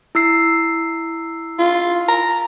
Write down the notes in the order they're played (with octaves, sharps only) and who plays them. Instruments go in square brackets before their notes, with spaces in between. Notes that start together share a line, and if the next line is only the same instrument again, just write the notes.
[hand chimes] E4 E6 C7
[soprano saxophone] F4
A#5